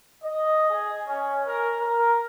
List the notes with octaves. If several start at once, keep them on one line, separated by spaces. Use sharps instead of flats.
D#5
G#4
C#4
A#4
A#4